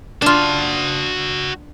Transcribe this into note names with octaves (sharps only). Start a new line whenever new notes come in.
D4 F4 F#4 A5